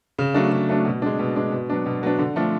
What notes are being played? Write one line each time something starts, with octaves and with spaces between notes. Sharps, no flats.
C#3
F#3 A3 D4
C#3
F#3 A3 D4
B2
G#3 D4
B2
G#3 D4
B2
F#3 B3 D4
B2
F#3 B3 D4
D3
F3 A3 D4